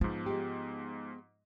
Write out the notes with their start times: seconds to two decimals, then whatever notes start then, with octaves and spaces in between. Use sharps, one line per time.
0.01 G#2 F3 B3
0.26 G#3 G4